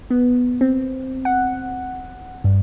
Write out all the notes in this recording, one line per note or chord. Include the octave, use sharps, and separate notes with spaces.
B3
C4
F#5
G2